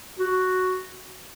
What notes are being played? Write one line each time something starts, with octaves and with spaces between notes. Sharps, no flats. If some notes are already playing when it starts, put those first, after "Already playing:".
F#4